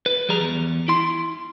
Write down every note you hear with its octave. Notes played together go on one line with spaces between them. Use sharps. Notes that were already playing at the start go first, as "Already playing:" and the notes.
B4
F3 G3 G#4 A#5
E2
E4 C6